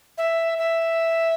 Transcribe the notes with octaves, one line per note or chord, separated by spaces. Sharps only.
E5
E5